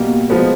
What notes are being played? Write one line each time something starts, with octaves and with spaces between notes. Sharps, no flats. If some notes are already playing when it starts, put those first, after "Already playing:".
Already playing: B2 G3 A#3
F3 G#3 B3